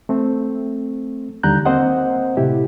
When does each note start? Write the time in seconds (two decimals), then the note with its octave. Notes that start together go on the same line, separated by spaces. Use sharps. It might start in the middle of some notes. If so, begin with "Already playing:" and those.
0.09 A3 C4
1.43 D#2 D3 G3 A#5 F#6 G6
1.65 A#3 C4 C5 D#5 F#5
2.37 A2 C3 E4 G4